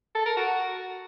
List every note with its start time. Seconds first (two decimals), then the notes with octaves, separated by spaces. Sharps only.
0.15 A4
0.26 A#4
0.37 F#4